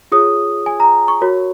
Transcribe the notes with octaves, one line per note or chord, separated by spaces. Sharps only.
F4 G#4 C#5 D#6
G#5
A#5
C#6
F#4 A#4 C#5